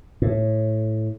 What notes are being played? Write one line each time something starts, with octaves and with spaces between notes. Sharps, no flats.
A2